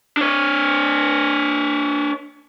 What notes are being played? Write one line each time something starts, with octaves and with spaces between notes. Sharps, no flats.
D4 C#5